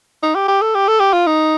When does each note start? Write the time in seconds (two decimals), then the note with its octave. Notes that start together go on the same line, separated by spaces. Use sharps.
0.23 D#4
0.35 G4
0.48 G4
0.62 A4
0.75 G4
0.88 A4
1.00 G4
1.13 F4
1.27 D#4